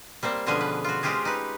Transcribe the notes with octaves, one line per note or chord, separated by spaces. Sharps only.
G3 A#3 C4 C5
B2 D3 F3 C#4 G#4 G#5
B4
F4 F#4
G#3 C4 C#4 F4 G4 G#4
D#4 B4